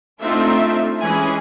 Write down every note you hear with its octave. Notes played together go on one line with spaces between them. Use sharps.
A3 C4 D4 D#4 F4 E5
E3 G#3 C#4 G#4 B4 G#5